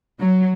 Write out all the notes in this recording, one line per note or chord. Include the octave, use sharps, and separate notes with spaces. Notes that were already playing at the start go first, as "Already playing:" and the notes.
F#3